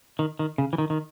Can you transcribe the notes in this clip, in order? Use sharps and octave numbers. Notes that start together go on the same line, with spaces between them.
D#3
D#3
C#3
E3
D#3
D#3